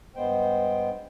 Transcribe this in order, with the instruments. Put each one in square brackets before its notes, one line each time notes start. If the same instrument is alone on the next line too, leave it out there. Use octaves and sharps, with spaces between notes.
[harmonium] G2 G#3 B3 C5 G5